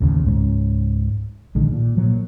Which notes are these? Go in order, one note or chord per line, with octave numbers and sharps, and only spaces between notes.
A1 D#2 C#3
C#2 G#2 C4 C#4
A#1 D3 D#3 G#3
A#2
A#2 F3 F#3 A#3